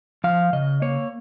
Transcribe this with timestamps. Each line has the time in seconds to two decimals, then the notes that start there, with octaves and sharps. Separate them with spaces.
0.24 F3 F5
0.53 C#3 D#5
0.82 A#3 C#5